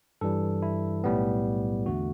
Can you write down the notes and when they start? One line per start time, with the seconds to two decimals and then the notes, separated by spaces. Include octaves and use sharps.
0.21 G2 E3 G3 A4
0.62 E4
1.04 B1 A2 G3 B3
1.86 E2 D3 A3 F#4